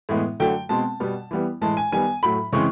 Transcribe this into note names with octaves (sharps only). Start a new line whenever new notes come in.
A2 E3 G#3 B3
D3 F#3 A3 G5
B2 G#3 C4 A5
B2 G3 B3
E3 G3 B3
A2 E3 G#3 A5
G#5
D#3 G3 B3 G#5
A2 F#3 A3 B5
C#3 E3 G#3 C4 C#6